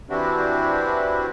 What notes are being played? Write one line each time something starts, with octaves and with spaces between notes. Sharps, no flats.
E3 C4 D4 E4 F#4 G4